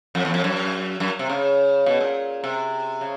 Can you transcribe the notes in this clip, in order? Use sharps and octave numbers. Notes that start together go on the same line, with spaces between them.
F2
E2
F2
F#2
F#2
C3
C#3
B2
A#2
C3
C#3